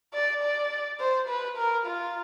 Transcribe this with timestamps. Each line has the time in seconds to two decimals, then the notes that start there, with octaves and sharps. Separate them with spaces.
0.13 D5
0.42 D5
1.00 C5
1.28 B4
1.57 A#4
1.86 F4